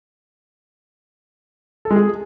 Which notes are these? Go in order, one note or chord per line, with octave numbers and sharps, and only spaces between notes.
A4
G#3
G#4